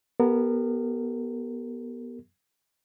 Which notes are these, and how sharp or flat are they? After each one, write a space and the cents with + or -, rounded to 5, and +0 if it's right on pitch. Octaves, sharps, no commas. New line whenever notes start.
B3 -25 G4 +0 A#4 -35